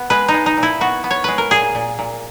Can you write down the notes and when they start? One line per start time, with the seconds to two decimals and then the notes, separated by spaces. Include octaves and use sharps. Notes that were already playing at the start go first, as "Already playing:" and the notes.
Already playing: B3
0.10 G#3 B4
0.28 D#4
0.34 G#3
0.46 D#4
0.57 A#2
0.63 E4
0.81 B3 F#4
1.04 B3
1.11 C#5
1.24 G#3 B4
1.38 A#4
1.51 A#2 G#4
1.75 A#2
1.99 A#2